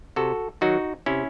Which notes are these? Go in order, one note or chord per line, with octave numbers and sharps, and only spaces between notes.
C3 F#4 A4
D#3 F#3 D#4 F#4
C3 C#4 E4